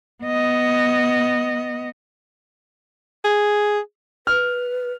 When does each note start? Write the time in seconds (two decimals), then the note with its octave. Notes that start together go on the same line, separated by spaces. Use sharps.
0.24 B3 D#5
3.24 G#4
4.27 B4 F6